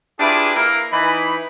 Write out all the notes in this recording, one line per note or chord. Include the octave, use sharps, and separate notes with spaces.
D4 E4 F4 G4 G#4 B4
A#3 E4 A#4
E3 D#4 B5